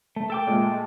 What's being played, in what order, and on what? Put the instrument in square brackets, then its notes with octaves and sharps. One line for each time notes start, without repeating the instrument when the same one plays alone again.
[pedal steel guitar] A3
A4 G5 D6
[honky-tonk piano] A#2 G#3 A3